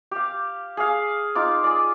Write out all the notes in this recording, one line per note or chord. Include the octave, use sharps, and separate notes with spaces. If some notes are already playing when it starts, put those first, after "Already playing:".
G4 F5
G#4 F5
D#4 F4 D6
G#4 D5